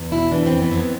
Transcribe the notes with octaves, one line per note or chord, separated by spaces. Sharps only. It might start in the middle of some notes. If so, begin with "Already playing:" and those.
Already playing: E2
B2 E4
E3 D4
C4
F2
B3
F2
B3